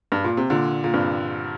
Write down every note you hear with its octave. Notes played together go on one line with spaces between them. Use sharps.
G2
A#2
C3
A#2 D3
A#2
G2 C3